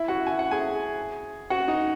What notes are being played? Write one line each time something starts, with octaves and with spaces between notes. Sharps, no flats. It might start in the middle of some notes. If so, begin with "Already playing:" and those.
Already playing: E4 E5
F#4 F#5
G#5
F#5
G#4 G#5
F#4 F#5
D#4 D#5